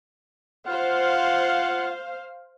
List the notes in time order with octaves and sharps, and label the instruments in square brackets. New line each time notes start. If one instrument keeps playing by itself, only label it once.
[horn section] F4 F#5 [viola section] C5 F5